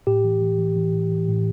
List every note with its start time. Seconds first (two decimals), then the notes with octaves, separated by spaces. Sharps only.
0.07 A2 G4
0.24 E3
0.42 E3
0.59 E3
0.76 E3
0.94 A2
1.11 E3
1.29 A2